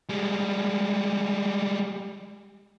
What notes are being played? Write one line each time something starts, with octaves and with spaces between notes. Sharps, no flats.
G3 G#3